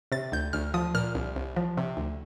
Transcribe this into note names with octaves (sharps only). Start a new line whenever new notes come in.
C3 A6
D2 G6
D2 F6
F3 D#6
A#2 F6
C2
C2
F3
C3
D2